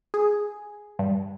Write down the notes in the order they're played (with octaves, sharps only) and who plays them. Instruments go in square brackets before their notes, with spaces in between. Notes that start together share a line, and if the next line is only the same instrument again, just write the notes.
[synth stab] G#4
G2